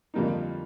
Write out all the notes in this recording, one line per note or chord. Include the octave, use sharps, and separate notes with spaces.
F2 D3 G3 A#3 D#4